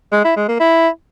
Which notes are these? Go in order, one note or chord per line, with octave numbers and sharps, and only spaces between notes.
G#3
E4
G#3
A#3
E4